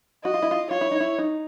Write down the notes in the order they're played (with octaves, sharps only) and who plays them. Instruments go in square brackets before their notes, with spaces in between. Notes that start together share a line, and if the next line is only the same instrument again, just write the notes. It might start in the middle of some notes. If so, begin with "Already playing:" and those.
[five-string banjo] F#4 [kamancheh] D#5
[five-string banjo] F4
E4
F4
[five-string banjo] F4 [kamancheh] C#5
[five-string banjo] E4
D#4
E4
D#4